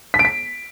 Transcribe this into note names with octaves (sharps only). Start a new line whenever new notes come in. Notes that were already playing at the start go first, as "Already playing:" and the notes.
B6
D7
B6